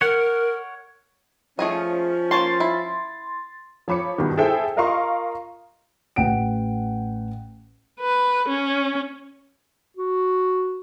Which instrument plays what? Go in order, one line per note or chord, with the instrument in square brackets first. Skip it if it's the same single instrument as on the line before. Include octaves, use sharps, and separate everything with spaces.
[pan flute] A#4 [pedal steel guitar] C#5 F#5
[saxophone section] F3 C#4 [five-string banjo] A3 G#4 D#5
[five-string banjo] A#3 C#5 A5 [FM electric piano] C6 A6
[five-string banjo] E4
[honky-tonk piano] F3 C#5 B5 D6 C#7
G2 B2 D#3
E4 G#4 A4 C5 E5 G5
F4 A#4 D#5 F5 C6 C#6
[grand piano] A1 F#5 G5 D7
[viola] B4
C#4
[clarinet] F#4